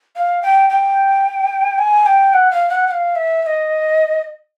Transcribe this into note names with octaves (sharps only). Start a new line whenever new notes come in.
F5
G5
G5
G#5
G5
F#5
F5
F#5
F#5
F5
E5
E5
D#5